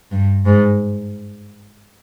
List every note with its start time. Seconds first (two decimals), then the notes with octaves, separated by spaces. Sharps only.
0.11 G2
0.46 G#2